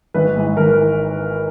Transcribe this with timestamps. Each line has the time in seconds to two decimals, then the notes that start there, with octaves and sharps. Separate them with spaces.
0.14 G#1 B4
0.36 G#2 E3
0.57 G#1 A#4
0.78 E3